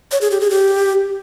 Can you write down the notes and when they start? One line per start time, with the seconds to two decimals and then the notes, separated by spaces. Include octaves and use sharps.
0.12 C#5
0.21 G#4
0.31 G4
0.41 G#4
0.50 G4